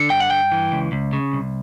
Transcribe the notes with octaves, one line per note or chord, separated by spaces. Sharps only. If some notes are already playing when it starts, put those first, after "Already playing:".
Already playing: D3
G2 G5
F#5
G2 G5
E3
C#2
C#2
C#3
C2